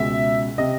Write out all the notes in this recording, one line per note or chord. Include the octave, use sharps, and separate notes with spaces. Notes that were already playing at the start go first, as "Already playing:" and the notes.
Already playing: C#2 B2 G#3 E5
C3 D#5